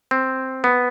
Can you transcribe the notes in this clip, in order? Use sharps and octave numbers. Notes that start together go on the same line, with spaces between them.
C4
B3